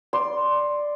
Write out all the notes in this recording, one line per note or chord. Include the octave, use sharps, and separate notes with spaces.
D5 C6